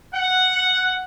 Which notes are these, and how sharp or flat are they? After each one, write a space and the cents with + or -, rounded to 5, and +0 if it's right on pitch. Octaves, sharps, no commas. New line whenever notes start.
F#5 +0